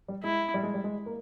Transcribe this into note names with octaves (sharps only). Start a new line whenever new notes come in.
G3
G#3 E4
G3
G#3
G3
G#3
A#3